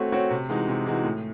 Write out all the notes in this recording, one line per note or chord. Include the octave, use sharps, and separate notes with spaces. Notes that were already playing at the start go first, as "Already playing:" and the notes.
Already playing: A3 C4 F#4 C#5
C4 F#4 C#5
C3
E3 G#3 D#4 F#4
C3
E3 G#3 D#4 F#4
A2